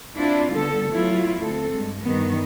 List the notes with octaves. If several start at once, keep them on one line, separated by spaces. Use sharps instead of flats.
C4 D4 E4 F4
D3 G3 B3 A4
F#3 A3 B3 E4 F4
D2 C4 A4
G2 G#3
G2 D#3 B3